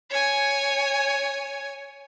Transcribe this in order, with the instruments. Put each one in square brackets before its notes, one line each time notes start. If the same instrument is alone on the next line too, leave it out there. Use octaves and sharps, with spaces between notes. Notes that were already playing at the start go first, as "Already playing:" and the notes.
[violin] C#5 G#5